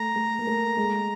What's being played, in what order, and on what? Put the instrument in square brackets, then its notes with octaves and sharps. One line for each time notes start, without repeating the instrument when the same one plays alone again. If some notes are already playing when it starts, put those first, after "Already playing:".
Already playing: [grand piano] A3 [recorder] A#5
[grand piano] A3
A#3
A3
G#3